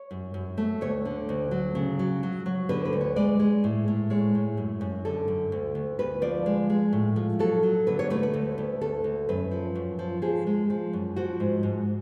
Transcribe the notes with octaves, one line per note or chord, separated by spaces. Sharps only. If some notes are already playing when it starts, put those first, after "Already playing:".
Already playing: C#5
F#2
F#2
A3
D2 C#5
D3
D2
F#3
C#3
F#3
F#3
F#3
D3 B4
B4
D2
C#5
G#3 D5
G#3
A2
A2
G#3 C#5
A2
F#2
F#2
D3 A4
F#2
D2
D2
D2 B4
F3 D5
G#3
G#3
A2
F3
F#3 A4
F#3
D3 B4
C#5
A3 B4
B4
D2
D2
D2 A4
D2
F#2 B4
F3
F#2
F3
F3 G#4
G#3
F3
F#2
F3 F#4
G#2
G#2